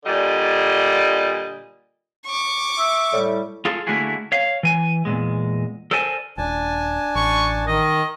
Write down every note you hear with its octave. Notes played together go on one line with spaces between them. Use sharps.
A#2 D3 G3 D#5
C#6 D6
E5
A2 G3
F4 G#4 A4
D3 A3 A#3 E4 F#4 G#4
C#5 F5
E3 G#5
E2 G2 A#2 G#3
A4 A#4 C5 D5 G#5 A5
D#1 D4 G#5 A5
A1 C#6
D#3 D#5